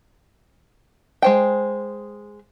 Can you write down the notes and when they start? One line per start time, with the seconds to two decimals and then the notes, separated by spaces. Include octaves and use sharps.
1.22 G#3 C5 G5